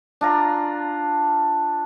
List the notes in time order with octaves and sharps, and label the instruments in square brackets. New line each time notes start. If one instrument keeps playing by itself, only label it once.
[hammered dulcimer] D4 F4 A#5